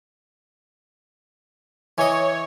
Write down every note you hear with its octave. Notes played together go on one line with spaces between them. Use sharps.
E3 C#5 D#5